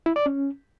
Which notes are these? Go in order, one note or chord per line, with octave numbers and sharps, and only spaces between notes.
E4
D5
C#4